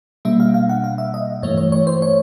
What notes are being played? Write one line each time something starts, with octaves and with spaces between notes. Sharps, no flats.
B2 G3 A#3 D4 E5
F5
F5
F#5
F5
E5
D#5
G2 E3 A3 C#5
C#5
C#5
C5
C#5